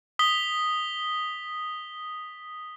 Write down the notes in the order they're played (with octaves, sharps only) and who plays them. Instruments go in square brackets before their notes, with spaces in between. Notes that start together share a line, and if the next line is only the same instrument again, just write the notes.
[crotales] D#6 B6 G7